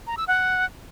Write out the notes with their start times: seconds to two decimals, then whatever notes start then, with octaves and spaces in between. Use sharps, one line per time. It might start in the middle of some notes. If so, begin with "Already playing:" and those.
0.07 A#5
0.17 E6
0.28 F#5